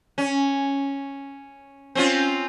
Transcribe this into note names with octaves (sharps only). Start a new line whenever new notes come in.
C#4
C4 C#4 F4